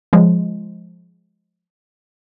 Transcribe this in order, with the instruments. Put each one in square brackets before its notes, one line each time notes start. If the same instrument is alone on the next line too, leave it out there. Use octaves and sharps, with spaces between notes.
[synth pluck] F3 G#3